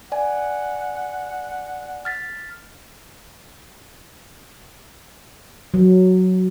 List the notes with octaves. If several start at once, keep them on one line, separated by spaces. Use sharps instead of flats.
D5 F#5 G#5
F6 A6 B6
F#3